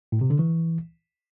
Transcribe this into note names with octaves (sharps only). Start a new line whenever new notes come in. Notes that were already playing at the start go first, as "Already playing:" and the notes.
A2
C3
D3
E3